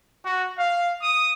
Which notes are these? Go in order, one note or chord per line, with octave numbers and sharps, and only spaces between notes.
F#4
F5
D#6